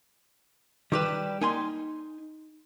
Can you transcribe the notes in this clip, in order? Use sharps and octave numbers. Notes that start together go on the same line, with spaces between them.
D#3 G3 G4 B4 E7
A#3 D#4 G#5 C6